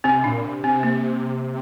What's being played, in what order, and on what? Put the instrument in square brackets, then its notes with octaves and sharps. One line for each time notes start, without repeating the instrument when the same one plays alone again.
[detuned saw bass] C3 [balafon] C4
[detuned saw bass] A#2 [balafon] D4
[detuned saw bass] C3
[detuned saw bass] C3 [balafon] C4
[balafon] A#3